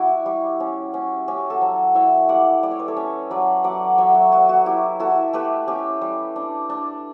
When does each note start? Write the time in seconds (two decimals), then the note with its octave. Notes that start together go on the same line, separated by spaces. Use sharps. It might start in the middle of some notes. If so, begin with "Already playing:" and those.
Already playing: G3 E4 F#4
0.26 G3
0.60 C#4
0.94 C#4
1.28 C#4 G4
1.50 F#4 A4
1.61 F#3
1.95 E4 C#5 E5
2.29 G3 D5 F#5
2.63 G3 D5
2.71 C#5
2.79 B4
2.88 A4 C#5
2.97 C#4
3.31 F#3 B4 D5
3.64 F#3 D5 F#5
3.98 F#3 C#5 E5
4.15 F#4
4.32 F#3 F#4
4.49 F#4
4.66 E4 G4
5.00 E4 F#4 A4
5.33 A3 G4 B4
5.68 C#4 G4
6.02 G3
6.36 D4
6.70 D4